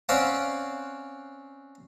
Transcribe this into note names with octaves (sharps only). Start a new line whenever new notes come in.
C4 C#4 C5 D5 F5 F#5